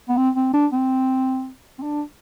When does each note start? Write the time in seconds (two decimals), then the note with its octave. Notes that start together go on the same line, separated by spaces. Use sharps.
0.09 B3
0.17 C4
0.35 C4
0.53 D4
0.73 C4
1.79 C4
1.82 D4